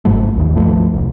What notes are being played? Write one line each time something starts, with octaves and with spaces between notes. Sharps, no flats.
G1 G#2 F#3 A3
A#1 D#2 D#3
C#2 G2 F3 A3
E1 C2